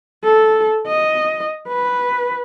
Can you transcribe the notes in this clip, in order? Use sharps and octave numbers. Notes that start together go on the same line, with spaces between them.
A4
D#5
B4